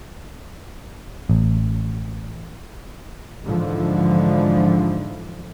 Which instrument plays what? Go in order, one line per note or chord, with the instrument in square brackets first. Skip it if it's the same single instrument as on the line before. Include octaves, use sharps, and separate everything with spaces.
[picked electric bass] A1
[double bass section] G#2 D3 E3 F3